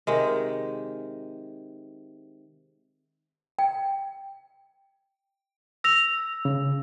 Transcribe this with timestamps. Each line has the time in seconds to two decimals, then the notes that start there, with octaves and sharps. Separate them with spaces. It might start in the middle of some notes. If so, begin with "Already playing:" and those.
0.07 C3 D#3 G#3
3.59 G5
5.84 E6 A#6 F7
6.45 C#3